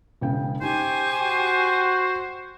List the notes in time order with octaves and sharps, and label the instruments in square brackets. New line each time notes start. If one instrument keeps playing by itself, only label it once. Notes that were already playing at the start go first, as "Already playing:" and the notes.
[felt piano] E1 C#3 G5
[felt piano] D#4 [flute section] G4 G#5 C#6 [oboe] C5
[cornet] F#4